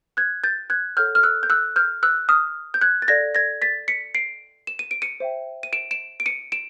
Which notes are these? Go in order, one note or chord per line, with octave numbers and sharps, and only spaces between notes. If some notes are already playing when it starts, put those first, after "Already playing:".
F#6 G#6
G6 A6
F#6 G#6
A4 C#5 F#5 F6 G6
F6
E6 F#6
G6
E6 F#6
F6 G6
E6 F#6
D#6 F6
G6
F#6 G#6
A6
A4 D5 F5 G#6 A#6
G#6 A#6
A6 B6
B6 C#7
C7 D7
E7
D#7
D7
C#7 D#7
C5 E5 G5
D#7
D7 E7
D7 E7
D7
C#7 D#7
D7 E7